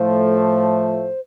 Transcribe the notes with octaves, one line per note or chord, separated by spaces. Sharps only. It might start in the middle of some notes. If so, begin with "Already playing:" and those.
Already playing: A2 F3 A3 C5